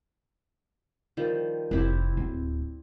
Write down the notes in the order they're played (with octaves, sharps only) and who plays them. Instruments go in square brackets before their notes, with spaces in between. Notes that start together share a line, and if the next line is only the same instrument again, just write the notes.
[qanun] D#3 F3 G3
[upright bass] F1 [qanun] C4 E4 G4
[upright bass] D1